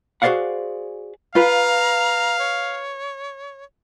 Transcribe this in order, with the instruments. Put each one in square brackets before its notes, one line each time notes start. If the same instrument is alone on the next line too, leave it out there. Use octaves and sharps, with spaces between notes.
[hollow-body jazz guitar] F#4 G#4 C5 D5 F5 F#5
[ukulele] F4 B4 [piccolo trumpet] F5 [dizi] A#5
[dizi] C#5